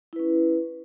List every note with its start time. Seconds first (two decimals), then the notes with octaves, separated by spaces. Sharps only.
0.13 E4
0.16 B4
0.19 C#4